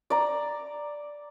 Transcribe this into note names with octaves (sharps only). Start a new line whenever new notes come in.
D5 A#5